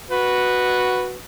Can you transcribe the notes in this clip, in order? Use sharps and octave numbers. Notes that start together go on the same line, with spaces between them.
F#4 B4